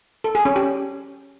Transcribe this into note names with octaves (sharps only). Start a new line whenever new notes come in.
A4
G#4
C#4
G4